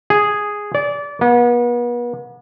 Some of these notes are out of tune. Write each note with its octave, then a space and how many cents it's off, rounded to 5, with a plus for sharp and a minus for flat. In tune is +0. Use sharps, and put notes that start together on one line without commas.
G#4 -5
D5 -25
B3 -40